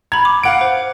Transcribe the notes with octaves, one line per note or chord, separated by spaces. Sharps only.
A#5 B5 G#6
D6
F5 F#5 D7
C5